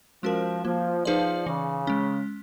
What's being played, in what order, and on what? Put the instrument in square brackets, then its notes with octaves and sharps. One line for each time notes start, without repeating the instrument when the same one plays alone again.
[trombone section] F3 [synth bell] G#3 C#4 F#4 A#4
[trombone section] F3 [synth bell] A#3
[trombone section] F3 [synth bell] D#4 G#4 B4 D5
[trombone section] C#3 [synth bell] E3
[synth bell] G#3 C#4